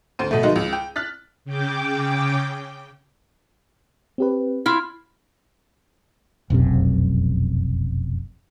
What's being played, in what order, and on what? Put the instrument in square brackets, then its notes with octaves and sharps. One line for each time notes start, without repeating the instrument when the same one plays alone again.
[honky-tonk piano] D2 C5 D#7
B2 A3
D#3 F3 G#3 D#4 F4 F#4
C#2
G5
F6 F#6 A6 B6
[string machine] C#3 G5 D6
[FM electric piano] C4 G4 B4
[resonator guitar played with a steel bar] E4 F4
[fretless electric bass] F1 B1 F#2 C3